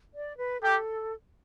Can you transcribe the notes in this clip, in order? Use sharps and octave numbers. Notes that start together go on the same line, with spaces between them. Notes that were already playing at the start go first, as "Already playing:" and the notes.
D5
B4
G4 A4